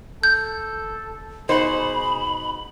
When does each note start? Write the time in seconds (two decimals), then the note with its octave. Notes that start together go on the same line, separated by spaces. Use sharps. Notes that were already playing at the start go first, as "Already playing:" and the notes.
0.23 A4 G6
1.49 B2 D#4 G#4 C5 B5